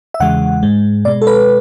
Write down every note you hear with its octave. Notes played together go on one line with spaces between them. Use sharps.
E5
E2 C#3 E3 G#3 F#5
G#2 G#3
B2 G#3 D5
A4
B4